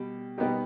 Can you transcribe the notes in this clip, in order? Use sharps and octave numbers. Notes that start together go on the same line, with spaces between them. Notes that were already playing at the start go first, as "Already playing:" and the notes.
Already playing: B2 G3 G4
B2 G3 B3 D#4 G4